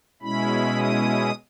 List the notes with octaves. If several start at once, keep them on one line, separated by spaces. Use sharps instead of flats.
B2 G#3 C#4 E4 B5
D#6